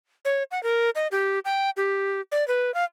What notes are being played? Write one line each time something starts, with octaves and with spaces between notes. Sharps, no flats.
C#5
F#5
A#4
D#5
G4
G5
G4
D5
B4
F5